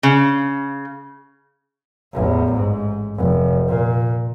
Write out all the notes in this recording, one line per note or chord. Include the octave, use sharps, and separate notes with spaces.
C#3
A1 E2
G#2
F1
A#2